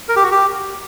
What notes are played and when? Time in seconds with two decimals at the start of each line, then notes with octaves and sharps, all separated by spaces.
0.09 A#4
0.16 G4
0.24 F#4
0.31 G4